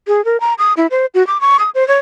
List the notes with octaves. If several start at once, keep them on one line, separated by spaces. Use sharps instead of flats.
G#4
A#4
A#5
D#6
E4
C5
F#4
D6
C#6
D#6
C5
C#5